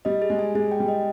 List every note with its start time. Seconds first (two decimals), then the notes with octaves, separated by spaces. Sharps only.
0.05 G3 D#5
0.22 G#4
0.30 G#3
0.39 G#5
0.55 G#3 G#4
0.71 G5
0.80 G3
0.88 D#5